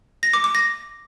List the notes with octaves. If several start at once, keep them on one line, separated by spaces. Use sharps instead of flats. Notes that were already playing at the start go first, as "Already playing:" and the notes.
A#6
D6
D6
A#6